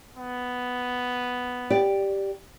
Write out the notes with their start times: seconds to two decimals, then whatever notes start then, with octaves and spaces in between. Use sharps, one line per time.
0.17 B3
1.70 G4 D5